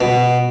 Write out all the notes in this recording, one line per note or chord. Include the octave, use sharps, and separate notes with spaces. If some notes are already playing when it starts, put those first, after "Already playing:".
B2